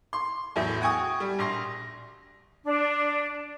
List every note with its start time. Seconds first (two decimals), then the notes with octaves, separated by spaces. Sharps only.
0.13 C6
0.56 E2 A2 F#3
0.81 F#4 G5 G#5 C#6 D#6
1.20 G3
1.39 A#1 C6 A#6
2.64 D4